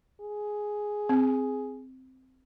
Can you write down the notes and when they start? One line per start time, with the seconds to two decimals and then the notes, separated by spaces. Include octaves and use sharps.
0.21 G#4
1.09 C4